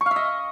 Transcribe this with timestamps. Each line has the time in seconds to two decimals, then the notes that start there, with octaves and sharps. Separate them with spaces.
0.01 C#6
0.06 F5
0.11 E5
0.16 D#5